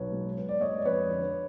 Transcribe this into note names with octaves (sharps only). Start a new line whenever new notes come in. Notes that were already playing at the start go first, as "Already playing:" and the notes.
Already playing: B1 B4 C#5
G#3
B3
D5
G#3 C#5 D#5
D5
F2 B4 C#5
D3